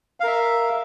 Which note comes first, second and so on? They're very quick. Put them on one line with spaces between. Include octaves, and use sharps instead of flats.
F5 A#4 E5